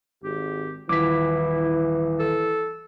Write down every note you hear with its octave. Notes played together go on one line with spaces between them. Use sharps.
G#1 G4
D#1 E3 E4 D6 B6
A4